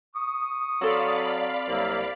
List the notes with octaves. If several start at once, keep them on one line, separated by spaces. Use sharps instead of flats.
C#6 D#6
F#3 C4 A4 C#5 D5 F5 B5
C2 C3 F#3 A#3